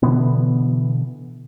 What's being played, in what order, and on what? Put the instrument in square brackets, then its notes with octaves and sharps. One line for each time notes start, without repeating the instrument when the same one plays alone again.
[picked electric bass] B2 D3 E3 B3